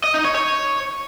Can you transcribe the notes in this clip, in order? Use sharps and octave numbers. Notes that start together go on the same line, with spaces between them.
D#5
D#4
C#5
C#5